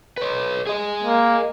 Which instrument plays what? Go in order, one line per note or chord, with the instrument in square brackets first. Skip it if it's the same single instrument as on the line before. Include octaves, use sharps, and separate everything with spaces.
[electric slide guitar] B4 C#5
G#4 D#5
[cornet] A#3